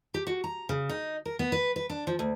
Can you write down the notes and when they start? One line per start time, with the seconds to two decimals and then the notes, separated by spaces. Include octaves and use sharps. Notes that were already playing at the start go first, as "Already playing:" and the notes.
0.14 G4
0.27 F#4
0.44 A#5
0.69 C#3
0.89 D#4
1.25 A#4
1.39 B3
1.52 B4
1.76 B4
1.90 D4
2.07 F3
2.19 D2